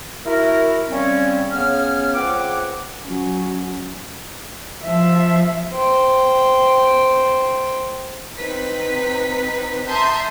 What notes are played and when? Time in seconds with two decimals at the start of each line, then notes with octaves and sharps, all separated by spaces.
0.25 E4 F#4 A#4
0.90 C#3 G3 C4 C#4
1.52 C#3 B3 C#4 F6
2.14 C#2 C4 G#4 F#5 D6
3.04 F#3 C#4
4.83 F3 E5
5.72 C5 G5
8.37 C4 D#4 B4 B6
9.87 E5 A5 A#5 C6 D#6 G6